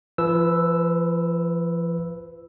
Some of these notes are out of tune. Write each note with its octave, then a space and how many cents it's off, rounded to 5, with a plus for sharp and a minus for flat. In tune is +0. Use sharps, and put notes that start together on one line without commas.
F3 -40 B4 +0 E6 +0